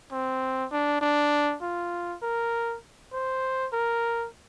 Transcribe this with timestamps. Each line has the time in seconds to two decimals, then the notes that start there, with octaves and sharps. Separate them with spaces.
0.12 C4
0.71 D4
1.01 D4
1.62 F4
2.22 A#4
3.13 C5
3.73 A#4